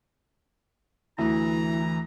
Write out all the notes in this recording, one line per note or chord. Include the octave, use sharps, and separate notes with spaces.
D2 E3 E4 A#5